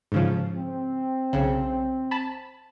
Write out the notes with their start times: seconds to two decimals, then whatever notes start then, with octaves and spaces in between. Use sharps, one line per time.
0.12 G#2 C#3 F3
0.56 C4
1.33 B1 C#3
2.11 A5 B5